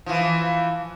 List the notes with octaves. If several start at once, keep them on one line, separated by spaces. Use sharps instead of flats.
E3 F3